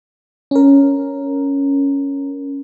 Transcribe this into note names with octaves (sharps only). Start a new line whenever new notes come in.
C#4 A#4